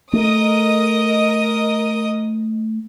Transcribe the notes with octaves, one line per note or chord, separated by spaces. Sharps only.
A3 A#4 D#5 D#6